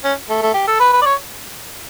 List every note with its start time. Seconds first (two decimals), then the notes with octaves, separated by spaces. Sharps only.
0.03 C#4
0.29 A3
0.42 A3
0.54 G4
0.67 A4
0.79 B4
0.93 B4
1.01 D5
1.05 C#5